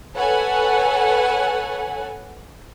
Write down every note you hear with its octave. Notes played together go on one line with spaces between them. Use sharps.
A4 B4 C#5 F#5 G#5